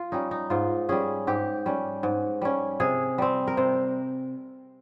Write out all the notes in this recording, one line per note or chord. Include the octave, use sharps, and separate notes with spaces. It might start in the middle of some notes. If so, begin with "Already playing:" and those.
Already playing: F4
G3 C#4 D#4
D#4
G#2 F4
G3 C#4 G#4
G#2 G4
G3 C#4
G#2
G3 C#4
C3 G#4
G3 C4
A#4
C3 C5